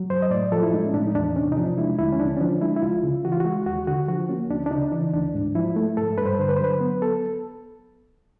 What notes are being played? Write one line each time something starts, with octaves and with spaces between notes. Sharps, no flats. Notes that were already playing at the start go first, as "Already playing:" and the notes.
Already playing: F#3
F#2 C5
D#5
A2 D5
F3 A4
E4
G#3 D#4
C#4
A2 D4
D#4
E2 D4
C3 C#4
D#4
F3 D4
G#3 E4
D2 E4
C#4
D3 D4
C#4
F3 D4
G#3 E4
E4
C#2 F4
C#3
E3 F#4
F4
F#4
G#3
D#2 F#4
D3 F#4
F3 F#4
A#3 C#4
D2 D4
D4
C#3 D#4
E3 D4
D2 D4
G#2
F3 E4
A3
G#2 A4
G2 B4
C5
B4
D3 C5
B4
C5
F#3 B4
B3
A4